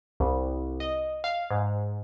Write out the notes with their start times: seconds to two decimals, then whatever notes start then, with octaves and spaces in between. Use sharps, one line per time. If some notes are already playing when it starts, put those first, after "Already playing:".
0.20 C2
0.80 D#5
1.24 F5
1.51 G#2